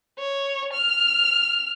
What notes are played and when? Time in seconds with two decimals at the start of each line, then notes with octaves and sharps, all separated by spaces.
0.19 C#5
0.73 F6